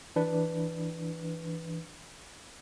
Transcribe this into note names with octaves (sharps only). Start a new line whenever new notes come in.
E3 D4 B4